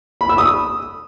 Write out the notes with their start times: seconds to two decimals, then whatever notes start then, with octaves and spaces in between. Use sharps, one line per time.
0.21 B5
0.29 E6
0.38 D#6